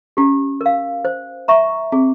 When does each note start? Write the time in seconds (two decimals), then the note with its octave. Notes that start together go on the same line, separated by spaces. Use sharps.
0.17 C#4 G4
0.61 A#4 F5
1.05 C5
1.48 E5 A#5 C#6
1.92 C4 G#4